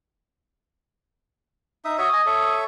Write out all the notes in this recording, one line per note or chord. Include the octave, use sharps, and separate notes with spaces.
D#4 E5 D#6
F#4 C#5 E5 D#6
D#5 G#5
A4 C#5 E5